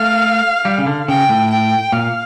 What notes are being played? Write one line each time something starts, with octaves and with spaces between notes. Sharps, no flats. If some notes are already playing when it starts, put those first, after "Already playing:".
Already playing: A3 F5
G3
C#3
D3
C#3 G5
A2
G5
A#2 F5